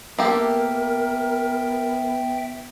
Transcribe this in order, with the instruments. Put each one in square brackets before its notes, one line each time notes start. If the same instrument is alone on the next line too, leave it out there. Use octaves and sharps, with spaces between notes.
[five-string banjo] A#3 G4 A4 [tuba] B3 [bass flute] A#4 [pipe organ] E5 G5